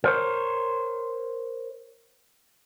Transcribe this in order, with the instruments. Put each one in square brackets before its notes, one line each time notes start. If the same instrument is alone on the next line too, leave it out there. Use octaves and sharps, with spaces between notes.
[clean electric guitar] A#4 C5 C#5